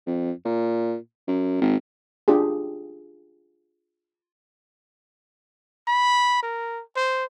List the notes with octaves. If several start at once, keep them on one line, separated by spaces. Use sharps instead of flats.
F2
A#2
F#2
G#1
D4 F4 G4 G#4
B5
A#4
C5